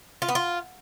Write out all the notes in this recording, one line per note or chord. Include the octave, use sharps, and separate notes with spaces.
F4
B3
F4